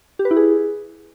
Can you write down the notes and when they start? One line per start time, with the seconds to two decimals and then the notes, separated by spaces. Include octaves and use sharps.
0.19 G4
0.25 B4
0.31 E4
0.37 G#4